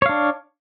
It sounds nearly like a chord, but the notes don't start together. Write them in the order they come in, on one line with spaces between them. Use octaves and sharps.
C#5 F5 D4